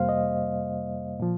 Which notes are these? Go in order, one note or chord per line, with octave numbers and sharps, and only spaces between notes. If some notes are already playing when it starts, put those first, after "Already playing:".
Already playing: F2 C3 G3 A#3 C5 F5
D#5
A#2 F3